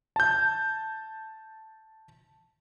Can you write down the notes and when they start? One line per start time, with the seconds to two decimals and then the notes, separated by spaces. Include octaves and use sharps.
0.16 A5 G6